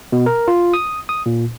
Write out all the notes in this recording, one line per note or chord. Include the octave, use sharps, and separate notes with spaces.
B2
A#4
F4
D#6
D#6
A#2